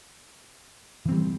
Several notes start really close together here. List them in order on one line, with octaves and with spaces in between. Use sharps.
E3 C4 G3